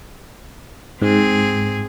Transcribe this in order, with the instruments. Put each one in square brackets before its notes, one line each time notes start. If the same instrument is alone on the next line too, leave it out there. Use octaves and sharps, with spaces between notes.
[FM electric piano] G#2 [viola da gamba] C4 G#4